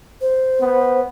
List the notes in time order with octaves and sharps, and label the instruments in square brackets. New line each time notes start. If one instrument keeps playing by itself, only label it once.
[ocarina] C5
[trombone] B3